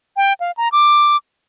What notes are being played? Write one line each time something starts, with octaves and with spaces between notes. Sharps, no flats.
G5
F5
A#5
D6